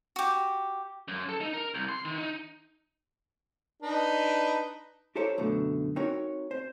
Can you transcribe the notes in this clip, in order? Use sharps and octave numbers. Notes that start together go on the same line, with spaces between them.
F#4 G4
F#2
A4
D#4
A#4
C2
C6
D#3
D#4
D4 D#4 B4
E4 G4 A4 A#4 C5 C#5
F#2 B2 D3 A3
C4 D#4 F#4 A#4 C#5
C5